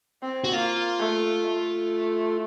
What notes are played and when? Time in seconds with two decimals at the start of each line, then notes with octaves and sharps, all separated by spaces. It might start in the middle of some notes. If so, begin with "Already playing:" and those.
0.22 C4
0.44 F#4
0.53 A#3 F4
0.99 A3
1.45 A3